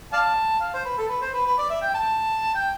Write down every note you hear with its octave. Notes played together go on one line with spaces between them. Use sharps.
D5 F5 A5
F5
C5
B4
A4
B4
C5
B4
B4
D5
E5
G5
A5
G5